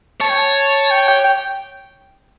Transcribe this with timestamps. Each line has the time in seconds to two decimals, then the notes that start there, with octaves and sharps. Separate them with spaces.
0.21 C#5 A5
0.29 G5
0.38 A5
0.90 G5
1.08 G5
1.24 G5